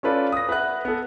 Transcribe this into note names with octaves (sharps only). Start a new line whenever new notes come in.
C#4 F4 A4 B4 D5
D#6 A#6
B4 E5 F#5 F#6
B3 A4